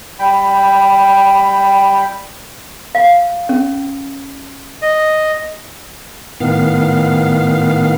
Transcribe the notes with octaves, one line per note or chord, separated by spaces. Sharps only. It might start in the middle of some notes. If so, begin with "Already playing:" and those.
G3 G5 B5
F5
C#4
D#5
A2 D#3 B3 F5